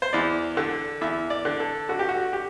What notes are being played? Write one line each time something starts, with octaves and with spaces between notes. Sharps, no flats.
C5
E2 D5
D3
E2 E5
D5
D3
A4
D3 F#4
G4
F#4
G4